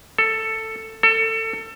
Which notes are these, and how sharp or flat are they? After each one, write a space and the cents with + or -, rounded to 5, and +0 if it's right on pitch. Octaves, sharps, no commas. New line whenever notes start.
A4 +10
A4 +25